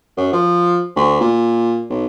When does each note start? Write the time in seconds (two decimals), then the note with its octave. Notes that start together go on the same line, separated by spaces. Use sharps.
0.17 F#2
0.32 F3
0.96 D2
1.20 A#2
1.90 B1